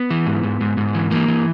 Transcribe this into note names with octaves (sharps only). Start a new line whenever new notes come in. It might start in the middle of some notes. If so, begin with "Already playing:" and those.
Already playing: B3
E3
G#2
G#2
G#2
G#2
E3
E3 A#3
E3